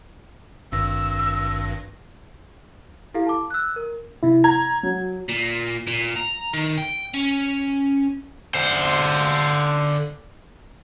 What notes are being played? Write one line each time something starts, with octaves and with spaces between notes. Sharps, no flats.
G#1 G2 E6 A#6
E4 G4 A4 F5
A5 D6
E6 F#6
A#4
C3 E4
A#5 G#6
F#3
A#2
A#2
A#5
D#3
G5
C#4
D3 C5